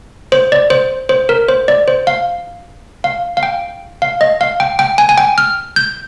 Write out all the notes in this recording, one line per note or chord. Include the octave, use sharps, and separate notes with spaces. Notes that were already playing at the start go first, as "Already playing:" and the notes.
C5
D5
C5
C5
A#4
C5
D5
C5
F5
F5
F5
G5
F5
D#5
F5
G5
G5
G#5
G#5
G5
F6
G6